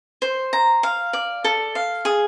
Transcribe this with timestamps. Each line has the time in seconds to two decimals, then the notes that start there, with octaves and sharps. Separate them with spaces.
0.22 C5
0.53 A#5
0.83 F5
1.13 D5
1.44 A4
1.75 F5
2.05 G#4